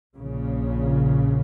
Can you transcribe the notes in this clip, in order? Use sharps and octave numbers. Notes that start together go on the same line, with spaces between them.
A#1 A#2 C#3